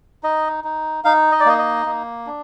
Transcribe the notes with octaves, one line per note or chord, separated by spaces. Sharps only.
D#4 D#5
D#4
D#4 F5
D#5
D5
A#3 D#5
D#5
A#3
D4